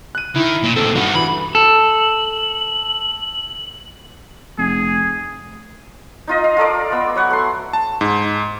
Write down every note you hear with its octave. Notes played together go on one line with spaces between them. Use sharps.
F#6 D#7
D#3 E4
A#2
A2 C4 A4
G2 D#4 F#4
E3 B5
A4 F#7
F1 G#4
D#4 F4 D#5
F5
F4 A4 A#4 D5
B3 E6
F#3 B4 F#5 C#6
A3 C6
A5
G#2